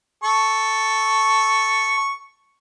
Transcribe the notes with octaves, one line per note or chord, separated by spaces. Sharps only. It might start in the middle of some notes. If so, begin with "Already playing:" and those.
A4 C#6